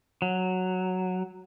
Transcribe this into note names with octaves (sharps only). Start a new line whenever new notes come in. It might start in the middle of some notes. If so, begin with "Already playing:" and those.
F#3